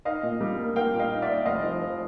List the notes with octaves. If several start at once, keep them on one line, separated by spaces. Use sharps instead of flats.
D#4 D#5 F5
A#2
G3
A#3
A#3 F5 G5
A#2
D#5 F5
D#4
D5 E5
D#4
F1 D#5 F5
F3
F3